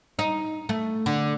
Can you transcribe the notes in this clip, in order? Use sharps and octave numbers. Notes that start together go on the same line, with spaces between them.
D#4
A3
D3